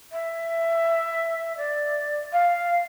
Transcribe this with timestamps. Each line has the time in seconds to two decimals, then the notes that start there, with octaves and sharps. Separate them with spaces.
0.12 E5
1.58 D5
2.33 F5